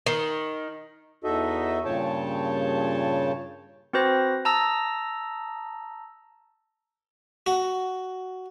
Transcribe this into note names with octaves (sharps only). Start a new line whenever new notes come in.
D#3
E2 D#4 F#4 A4 D#5 E5
G2 A#2 C#3 C#5 G5 A5
C4 F#4 B4 C5 A#6
A5 A#5 D#6 E6 A#6
F#4